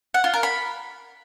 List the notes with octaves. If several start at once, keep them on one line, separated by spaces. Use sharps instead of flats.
F#5
F4
A#4
B5